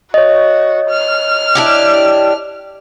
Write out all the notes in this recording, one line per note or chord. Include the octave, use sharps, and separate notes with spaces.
F#4 C#5 D#5
F6
D4 E4 G4